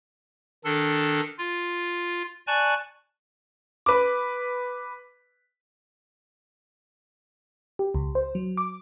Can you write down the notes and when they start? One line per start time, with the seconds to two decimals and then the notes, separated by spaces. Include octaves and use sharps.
0.65 D#3 D4 A4
1.38 F4
2.47 D5 G#5 A5 C#6 F#6
3.86 B4 D6
7.79 G4
7.95 C#2
8.15 C5
8.35 F#3
8.57 D6